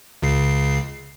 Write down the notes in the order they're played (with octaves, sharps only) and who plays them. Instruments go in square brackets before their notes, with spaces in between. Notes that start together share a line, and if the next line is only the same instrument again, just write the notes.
[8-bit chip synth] C#2 C#3 C7